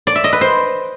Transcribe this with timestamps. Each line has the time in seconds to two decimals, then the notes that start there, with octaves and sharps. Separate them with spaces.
0.07 D5
0.15 E5
0.24 D#5
0.33 B4
0.41 C5